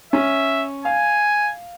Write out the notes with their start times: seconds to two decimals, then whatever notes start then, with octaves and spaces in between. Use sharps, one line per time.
0.13 C#4 E5
0.85 F5 G#5